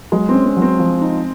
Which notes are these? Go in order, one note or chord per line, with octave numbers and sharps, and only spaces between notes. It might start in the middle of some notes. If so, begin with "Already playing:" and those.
F#3 G#3
C4
C#4
C4
F#3
C4
F3
D#4